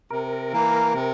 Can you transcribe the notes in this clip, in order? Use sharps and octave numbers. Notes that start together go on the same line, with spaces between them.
C3 A#4
E3 A#3
C3